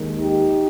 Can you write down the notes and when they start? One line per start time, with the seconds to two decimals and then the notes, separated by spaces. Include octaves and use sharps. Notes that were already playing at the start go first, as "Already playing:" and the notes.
Already playing: D#2 D#3 G#3
0.19 D#4 G4